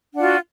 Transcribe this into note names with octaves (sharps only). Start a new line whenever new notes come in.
D4 F4 F#4 F#5